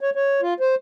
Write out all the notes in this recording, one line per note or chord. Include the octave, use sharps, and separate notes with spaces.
C#5
C#5
F4
C5